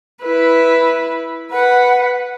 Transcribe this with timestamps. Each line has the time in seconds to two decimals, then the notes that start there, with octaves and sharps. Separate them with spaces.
0.23 E4 B4
1.52 B4 F#5